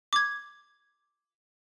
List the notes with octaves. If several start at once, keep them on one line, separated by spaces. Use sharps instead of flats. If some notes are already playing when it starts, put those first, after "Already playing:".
D6 G#6